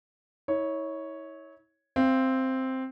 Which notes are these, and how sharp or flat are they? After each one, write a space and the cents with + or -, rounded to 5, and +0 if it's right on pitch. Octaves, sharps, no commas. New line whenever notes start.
E4 -40 C#5 +0
C4 +0 F5 -30